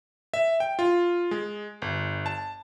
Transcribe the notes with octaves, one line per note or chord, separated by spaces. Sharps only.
E5
G5
F4
G#3
G1
A5